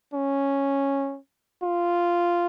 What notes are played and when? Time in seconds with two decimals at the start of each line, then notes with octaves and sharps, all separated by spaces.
0.13 C#4
1.63 F4